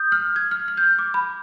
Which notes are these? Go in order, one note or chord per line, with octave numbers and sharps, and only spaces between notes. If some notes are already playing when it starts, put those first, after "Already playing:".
Already playing: D#6 G6
F6
G#6
F6
F6
G6
F6
D6
B5